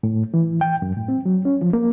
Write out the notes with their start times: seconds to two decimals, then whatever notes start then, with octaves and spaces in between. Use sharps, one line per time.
0.03 A2
0.34 E3
0.61 G5
0.82 F#2
0.97 A2
1.08 C4
1.26 F#3
1.45 C#4
1.61 F3
1.73 A#3